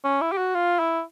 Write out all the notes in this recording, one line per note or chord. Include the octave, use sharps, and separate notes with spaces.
C#4
E4
G4
F#4
F4
E4